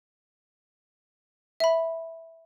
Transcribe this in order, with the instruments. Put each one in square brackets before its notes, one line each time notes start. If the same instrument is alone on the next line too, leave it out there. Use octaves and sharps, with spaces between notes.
[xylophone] E5 B5